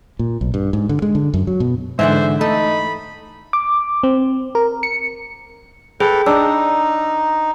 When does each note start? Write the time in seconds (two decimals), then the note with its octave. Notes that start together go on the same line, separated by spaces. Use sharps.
0.19 A#2
0.41 B1
0.54 G2
0.73 G#2
0.89 D3
1.02 G#3
1.15 D3
1.34 F#2
1.47 F#3
1.60 B2
1.99 G#2 D3 E3 C5 D5 E5 F#5
2.41 A3 D#4 A4 B5
3.53 D6
4.03 C4
4.55 A#4
4.83 C#7
6.00 G#4 A4 B4 G5
6.26 D4 D#4 E6